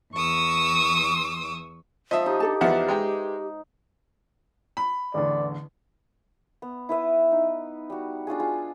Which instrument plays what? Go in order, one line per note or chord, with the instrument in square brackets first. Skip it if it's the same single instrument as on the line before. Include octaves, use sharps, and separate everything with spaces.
[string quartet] E2 C#6 D#6 E6
[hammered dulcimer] F3 [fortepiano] D#5 E5
[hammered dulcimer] D#4 [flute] G4
[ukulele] D4 A4 A5
[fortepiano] E2 F3 F#5 [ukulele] B4 D5 E5
[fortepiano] G#3 G5 A#5
[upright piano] B5
[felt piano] A1 E2 D3 [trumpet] D5
[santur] B3
E4 B4 E5 D#6
D#4
G3 F#4
D4 F4 F#4 G#4
F4 G#4